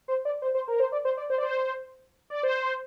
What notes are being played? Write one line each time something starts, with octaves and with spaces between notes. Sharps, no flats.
C5
D5
C5
C5
A#4
C5
D5
C5
D5
C5
D5
C5
D5
C5